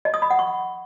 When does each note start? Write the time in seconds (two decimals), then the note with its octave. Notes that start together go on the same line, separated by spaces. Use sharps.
0.05 D#5
0.14 D#6
0.22 B5
0.30 F#5
0.39 C#6